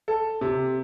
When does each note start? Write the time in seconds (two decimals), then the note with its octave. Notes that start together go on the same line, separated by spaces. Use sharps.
0.08 A4
0.41 C3